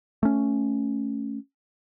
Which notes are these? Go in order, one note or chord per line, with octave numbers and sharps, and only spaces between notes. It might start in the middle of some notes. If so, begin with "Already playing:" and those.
A3 C#4